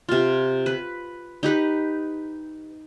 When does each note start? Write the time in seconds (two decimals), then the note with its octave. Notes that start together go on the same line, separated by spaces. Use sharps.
0.09 C3 F4
0.66 B4
1.43 D#4 G4 B4